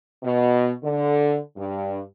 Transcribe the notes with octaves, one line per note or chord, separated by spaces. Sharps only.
B2
D3
G2